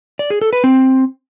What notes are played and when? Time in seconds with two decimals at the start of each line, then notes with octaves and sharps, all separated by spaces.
0.19 D5
0.30 G#4
0.42 A4
0.53 B4
0.64 C4